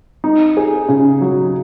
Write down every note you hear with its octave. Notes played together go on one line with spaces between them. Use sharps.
D#4
G#4
C#3
F#3